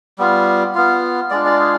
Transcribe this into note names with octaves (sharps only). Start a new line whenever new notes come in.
G3 B3 F4
B3 F4
G#3 D4 F4 D5
D5
G#4